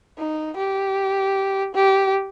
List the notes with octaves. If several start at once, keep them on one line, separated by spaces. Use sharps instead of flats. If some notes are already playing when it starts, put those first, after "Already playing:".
D#4
G4
G4